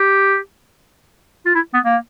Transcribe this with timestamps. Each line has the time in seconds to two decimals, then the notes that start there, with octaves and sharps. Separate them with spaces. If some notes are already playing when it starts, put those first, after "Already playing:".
Already playing: G4
1.45 F4
1.55 E4
1.74 B3
1.84 A#3